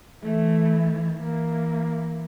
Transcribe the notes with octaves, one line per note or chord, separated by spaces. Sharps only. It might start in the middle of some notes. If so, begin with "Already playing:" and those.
E3 A3
E3 A#3